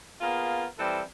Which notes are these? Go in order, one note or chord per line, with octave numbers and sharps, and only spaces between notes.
A#3 B3 F4 G#4
E3 G3 C4 A4